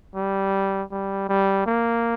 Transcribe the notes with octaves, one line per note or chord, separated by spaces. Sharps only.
G3
G3
G3
A#3